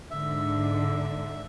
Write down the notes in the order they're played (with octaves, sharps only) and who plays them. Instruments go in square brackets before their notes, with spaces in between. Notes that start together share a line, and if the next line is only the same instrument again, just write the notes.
[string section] G#2 D3 [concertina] E5